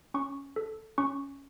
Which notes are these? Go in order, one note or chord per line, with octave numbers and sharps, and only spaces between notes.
C#4 C#6
A4
C#4 C#6